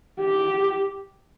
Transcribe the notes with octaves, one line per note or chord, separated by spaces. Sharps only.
G4